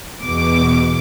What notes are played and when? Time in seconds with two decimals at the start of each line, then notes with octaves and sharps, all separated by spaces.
0.23 E2 B2 D6